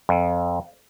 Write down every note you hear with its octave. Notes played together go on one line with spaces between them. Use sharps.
F2